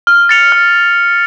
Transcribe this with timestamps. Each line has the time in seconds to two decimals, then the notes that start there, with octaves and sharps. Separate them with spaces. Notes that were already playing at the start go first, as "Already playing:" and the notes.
0.07 F6
0.29 A6 C#7 F7
0.52 F6